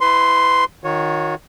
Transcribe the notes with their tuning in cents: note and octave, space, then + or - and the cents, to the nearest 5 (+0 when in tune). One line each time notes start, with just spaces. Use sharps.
E4 +0 B4 +25 C6 +0
D#3 +0 F#4 -45 C#5 +0